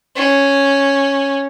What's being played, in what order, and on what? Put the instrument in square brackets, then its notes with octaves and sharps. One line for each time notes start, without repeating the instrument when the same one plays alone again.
[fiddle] C#4